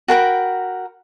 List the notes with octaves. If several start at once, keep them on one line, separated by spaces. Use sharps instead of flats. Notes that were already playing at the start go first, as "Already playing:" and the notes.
F#4 A#4 G5 B5